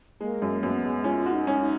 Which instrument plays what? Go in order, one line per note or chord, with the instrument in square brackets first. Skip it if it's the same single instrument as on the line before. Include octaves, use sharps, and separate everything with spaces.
[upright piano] G#3 [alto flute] A#3
[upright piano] F#2
[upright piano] F#2 [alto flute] B3
[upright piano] G#3
[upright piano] C#4 [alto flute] F4
[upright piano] F#4
[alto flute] D#4
[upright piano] C#4
[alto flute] D#4